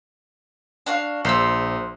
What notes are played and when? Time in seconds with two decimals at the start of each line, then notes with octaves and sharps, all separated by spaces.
0.86 D4 F#4 F5
1.25 A#1 C5 E6